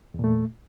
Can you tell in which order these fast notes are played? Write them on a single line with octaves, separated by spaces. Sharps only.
E2 A#2 A3